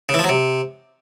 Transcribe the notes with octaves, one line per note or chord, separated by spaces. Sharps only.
C#3
E3
F3
F#3
C3